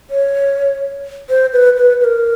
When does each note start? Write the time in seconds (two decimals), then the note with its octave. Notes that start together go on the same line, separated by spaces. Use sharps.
0.10 C#5
1.29 C5
1.53 B4
1.77 B4
2.01 B4
2.04 A#4